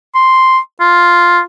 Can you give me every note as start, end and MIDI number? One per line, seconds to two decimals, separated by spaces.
0.15 0.58 84
0.81 1.40 65